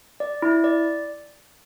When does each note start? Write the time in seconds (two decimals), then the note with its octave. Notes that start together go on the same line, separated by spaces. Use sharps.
0.20 D5
0.42 E4
0.64 D5